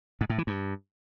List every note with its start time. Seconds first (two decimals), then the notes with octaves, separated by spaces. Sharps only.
0.21 G#2
0.30 A2
0.38 E3
0.47 G2